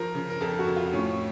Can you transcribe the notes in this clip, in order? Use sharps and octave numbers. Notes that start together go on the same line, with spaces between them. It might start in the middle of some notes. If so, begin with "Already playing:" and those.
Already playing: F3 A#4
C#3
A#4
F2 A4
F#4
F2
F4
A2 C#4